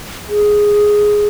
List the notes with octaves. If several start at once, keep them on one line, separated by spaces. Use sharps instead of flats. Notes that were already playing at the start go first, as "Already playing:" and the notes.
G#4